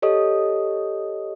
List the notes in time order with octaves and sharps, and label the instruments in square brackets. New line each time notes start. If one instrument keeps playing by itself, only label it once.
[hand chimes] G4 A4 C#5 D#5 D#6